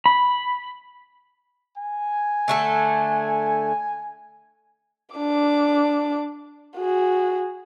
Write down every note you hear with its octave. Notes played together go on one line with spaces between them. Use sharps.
B5
G#5
D3 A3 A4
D4 D6
F#4 G#4